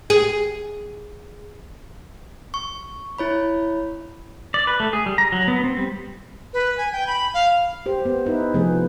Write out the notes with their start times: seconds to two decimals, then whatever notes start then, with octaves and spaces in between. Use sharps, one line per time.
0.10 G#4
2.54 C#6
3.18 E4 C#5 B5
4.54 D5
4.67 B4
4.80 A3
4.93 G#4
5.06 G3
5.18 A#5
5.32 F#3
5.48 B3
5.64 C4
5.77 G3
6.53 B4
6.77 G#5
6.92 G5
7.07 B5
7.34 F5
7.86 G4 C5
8.05 B3
8.26 B3 D#4 E4 B4
8.54 C3 F3 A3 B3 G#4 B4